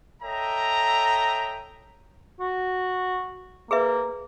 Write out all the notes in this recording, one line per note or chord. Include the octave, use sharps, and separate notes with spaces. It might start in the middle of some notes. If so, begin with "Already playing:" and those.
A4 C#5 D#5 E5 G5 A#5
F#4
A#3 G#4 B4 E5